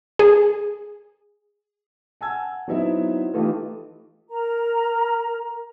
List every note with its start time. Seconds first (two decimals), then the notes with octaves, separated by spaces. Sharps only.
0.19 G#4
2.21 F#5 G#5 A5 E6 G#6
2.68 F#3 B3 C4 D#4 E4 E5
3.34 E3 A3 D#4 F4 G4
4.29 A#4 A#5